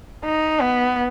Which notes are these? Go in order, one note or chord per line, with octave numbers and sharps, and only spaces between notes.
D#4
B3